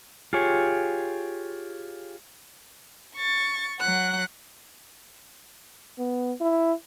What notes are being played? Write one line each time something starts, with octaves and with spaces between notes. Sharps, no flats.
F4 G4 G#4 C#5
C#6 A6
F#3 F#5 F#6
B3
E4